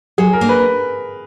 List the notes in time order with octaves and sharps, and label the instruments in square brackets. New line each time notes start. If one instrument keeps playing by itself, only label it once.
[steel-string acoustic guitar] F#3 [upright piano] G#4
[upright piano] A#4
[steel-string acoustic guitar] A#3 D4
[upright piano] B4